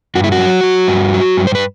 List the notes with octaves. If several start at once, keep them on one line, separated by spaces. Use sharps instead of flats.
G2 F#4
E4
F#4
F#3
F#3
G2
F#3
G2
C5
B4